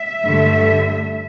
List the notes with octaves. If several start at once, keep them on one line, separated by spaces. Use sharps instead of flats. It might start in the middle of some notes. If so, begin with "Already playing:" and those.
Already playing: E5
G2 D3 A3